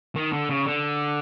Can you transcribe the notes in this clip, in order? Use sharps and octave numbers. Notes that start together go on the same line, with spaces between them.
D#3
D3
C#3
D3